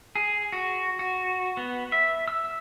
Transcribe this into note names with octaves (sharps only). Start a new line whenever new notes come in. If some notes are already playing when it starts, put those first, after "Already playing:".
G#4
F#4
F#4
B3
E5
E6